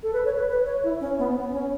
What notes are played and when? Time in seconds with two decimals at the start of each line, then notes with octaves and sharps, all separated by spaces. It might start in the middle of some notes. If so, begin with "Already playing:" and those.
0.03 A4
0.13 B4
0.25 C#5
0.37 B4
0.48 B4
0.65 C#5
0.83 E4
1.01 C#4
1.18 B3
1.36 B3
1.53 C#4